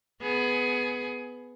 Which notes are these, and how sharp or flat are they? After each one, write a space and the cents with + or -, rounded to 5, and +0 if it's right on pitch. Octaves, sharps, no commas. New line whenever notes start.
B3 +10 G#4 +20